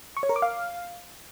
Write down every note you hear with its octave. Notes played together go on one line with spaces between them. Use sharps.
C#6
C#5
A#4
D6
F5